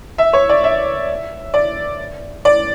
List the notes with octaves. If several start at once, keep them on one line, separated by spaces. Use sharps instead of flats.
E5
C#5
D5
E5
D5
D5